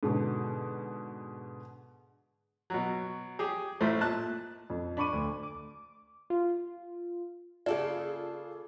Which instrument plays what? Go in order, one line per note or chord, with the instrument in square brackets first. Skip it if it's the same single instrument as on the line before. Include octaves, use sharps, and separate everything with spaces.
[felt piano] G#2 B2 D3
[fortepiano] B2 F#3
G4 G#4
A1 A2 A3 C5
A#2 A5 F#6
[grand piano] F2
D4 B5 C#6 D6 D#7
D2
[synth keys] D6
F4
[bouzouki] C#3 A#3 A4 [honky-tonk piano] F4 G#4 [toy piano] D5